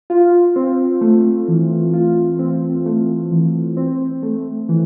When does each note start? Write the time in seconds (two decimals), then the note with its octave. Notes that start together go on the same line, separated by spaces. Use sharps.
0.10 F4
0.56 C4
1.01 A3
1.48 E3
1.93 F4
2.39 C4
2.86 A3
3.31 E3
3.77 C4
4.23 A3
4.69 E3